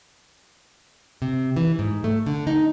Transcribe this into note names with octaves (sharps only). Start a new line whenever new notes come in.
C3
E3
G#2
A3
D3
D#4